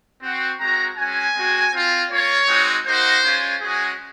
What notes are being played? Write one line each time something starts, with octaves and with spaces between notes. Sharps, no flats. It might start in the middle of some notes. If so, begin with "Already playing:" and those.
C4 F#4
G#3 C4 F#4 A#5
G#3 C#4 F#4 G#5
G#3 C4 F#4
C4 F4
A#3 F4 C#5
G#3 C4 D#4 F#4
A#3 D#4 F#4 C5
G#3 C#4 F4
G#3 C#4 F#4 G#4